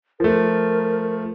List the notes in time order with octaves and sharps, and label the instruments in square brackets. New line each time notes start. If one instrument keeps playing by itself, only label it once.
[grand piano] F3 A3 [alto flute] A#4